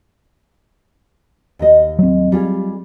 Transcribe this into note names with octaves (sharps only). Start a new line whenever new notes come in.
D#2 D#5
F#3 C4
G3 F4 G#4